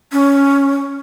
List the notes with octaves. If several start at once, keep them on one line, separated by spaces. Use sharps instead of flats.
C#4